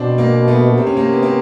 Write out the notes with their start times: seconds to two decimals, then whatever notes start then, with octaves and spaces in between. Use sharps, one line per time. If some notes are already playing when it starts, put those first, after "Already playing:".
Already playing: B2 C4 D4
0.18 A#3 C4
0.48 A3 B3
0.71 B2
0.78 C3 C4
0.87 C#4
0.97 A#3 C4
1.12 B3
1.22 A#3 C4